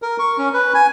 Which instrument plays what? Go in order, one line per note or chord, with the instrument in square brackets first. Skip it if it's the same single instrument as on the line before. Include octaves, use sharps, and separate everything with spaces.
[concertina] A#4
C#6
C#4
B4
G#5